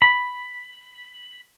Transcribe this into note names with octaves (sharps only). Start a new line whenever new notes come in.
B5